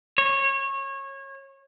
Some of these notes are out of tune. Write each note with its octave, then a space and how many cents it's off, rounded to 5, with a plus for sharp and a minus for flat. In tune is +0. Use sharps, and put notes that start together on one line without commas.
C#5 -25